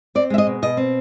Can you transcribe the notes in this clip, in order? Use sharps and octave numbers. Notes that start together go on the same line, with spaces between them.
C4 D5
G#3 E5
D#5
B2
B2 D#5
C4